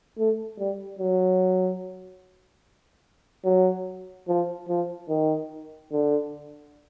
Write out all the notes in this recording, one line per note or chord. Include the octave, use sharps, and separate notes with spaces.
A3
G3
F#3
F#3
F3
F3
D#3
D3